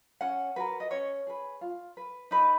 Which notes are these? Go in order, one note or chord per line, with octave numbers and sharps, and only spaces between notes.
C#4 F#5
F#4 A#4 B4
D#5
C#4 C#5
G#4 B4
F4
B4
D#4 B4